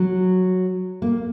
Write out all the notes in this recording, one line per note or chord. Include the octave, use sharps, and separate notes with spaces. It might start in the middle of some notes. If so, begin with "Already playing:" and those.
Already playing: F#3
A#3